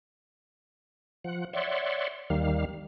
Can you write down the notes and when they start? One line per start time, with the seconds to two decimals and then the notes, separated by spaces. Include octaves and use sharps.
1.24 F3 F#5
1.53 C#5 D5 E5 F#5 C6
2.30 D#2 D#3 G3 F5